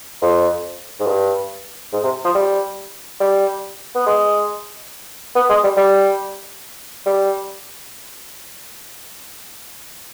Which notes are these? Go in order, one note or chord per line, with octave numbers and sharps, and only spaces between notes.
F2
G#2
G2
G#2
C3
F3
G3
G3
B3
G#3
B3
G#3
G3
G3
G3